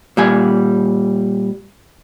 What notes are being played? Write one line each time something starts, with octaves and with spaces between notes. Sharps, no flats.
A#2 G3 G#5